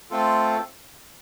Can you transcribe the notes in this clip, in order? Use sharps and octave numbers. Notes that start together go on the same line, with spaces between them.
A3 C4 F4 A4